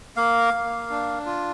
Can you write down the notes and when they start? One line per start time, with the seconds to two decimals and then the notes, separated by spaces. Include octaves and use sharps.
0.17 A#3 F5
0.54 A#3
0.90 D4
1.26 F4